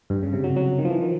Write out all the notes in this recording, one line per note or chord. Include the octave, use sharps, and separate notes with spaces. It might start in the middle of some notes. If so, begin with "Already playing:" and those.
G2
C#3
C3
F#3
F#3
D#3
F3
E3
D#3